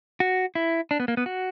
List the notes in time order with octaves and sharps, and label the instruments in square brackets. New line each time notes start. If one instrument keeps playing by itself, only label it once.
[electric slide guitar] F#4
E4
D4
B3
A#3
B3
F#4